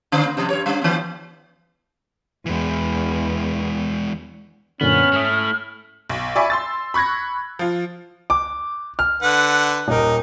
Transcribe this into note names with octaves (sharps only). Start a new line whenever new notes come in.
D3 D4 C5
A#3
C3 F3 D4
G2 C#5
G3 D4
E3 B3
E2 E3 G#3
F#2 A#2 D3 B3 C#4 F6
G#2 A3 E4 D#6
B1
D5 E5 G#5 B5 C#6
C6 E6 A6
B5 C#6 F#6 G#6 A#6
F3 F4
D6
F6
D3 B4 F#5
D#1 D#4 A#4